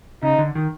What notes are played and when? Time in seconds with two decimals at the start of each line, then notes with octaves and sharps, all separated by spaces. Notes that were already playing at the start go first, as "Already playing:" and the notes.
0.23 C#3 D#4
0.38 D3
0.55 D#3